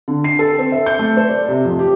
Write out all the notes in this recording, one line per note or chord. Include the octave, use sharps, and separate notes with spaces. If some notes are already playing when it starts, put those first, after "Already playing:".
D3
C7
A4
C4
E5
G6
A3
C5
D5
C3
F2
G4